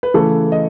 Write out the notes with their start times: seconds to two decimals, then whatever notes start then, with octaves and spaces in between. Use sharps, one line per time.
0.03 B4
0.14 C#3 E3 A3 A4
0.52 D#5